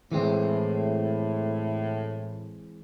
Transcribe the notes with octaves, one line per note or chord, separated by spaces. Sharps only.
A2 E3 G#3 C4